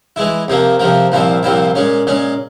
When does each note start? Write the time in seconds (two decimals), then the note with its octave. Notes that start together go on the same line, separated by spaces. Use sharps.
0.16 E3 G#3 E4
0.48 F2 C3 F3 A#3
0.79 F2 C3 F3 A#3
1.12 C2 A#2 F3 C4 E4
1.43 C2 A#2 F3 C4 E4
1.75 A#2 G#3 C#4
2.07 A#2 G#3 C#4